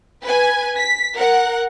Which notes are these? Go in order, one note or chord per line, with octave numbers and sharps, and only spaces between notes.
B4 G#5
B6
A#4 F#5